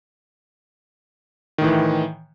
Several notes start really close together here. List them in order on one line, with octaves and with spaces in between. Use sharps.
D#3 A2 E3